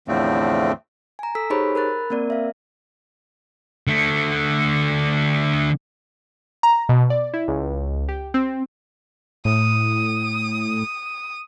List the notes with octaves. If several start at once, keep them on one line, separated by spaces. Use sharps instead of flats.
E2 A2 D3 F3 A3 C4
G#5 A#5
A4 E6 B6
D#4 G4 G#4 C5 C#5 B5
A#4 B5 F#6 A6
A#3 C4 A#4 D5
E5 F5
D3 A3
A#5
B2
D5
E4
C#2
G4
C4
A2 D#6